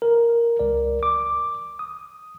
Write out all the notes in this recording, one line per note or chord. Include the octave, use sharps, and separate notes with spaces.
A#4
C#2 A#4 D5
D6
D#6